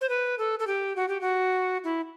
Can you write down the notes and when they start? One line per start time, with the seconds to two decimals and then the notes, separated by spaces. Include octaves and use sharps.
0.01 C5
0.09 B4
0.38 A4
0.59 A4
0.67 G4
0.96 F#4
1.08 G4
1.21 F#4
1.84 E4